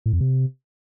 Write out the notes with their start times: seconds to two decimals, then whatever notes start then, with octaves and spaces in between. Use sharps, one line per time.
0.06 A2
0.13 F2
0.21 C3